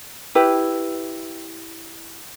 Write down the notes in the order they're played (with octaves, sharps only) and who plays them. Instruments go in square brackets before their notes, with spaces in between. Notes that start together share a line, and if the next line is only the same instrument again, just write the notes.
[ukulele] E4 G4 B4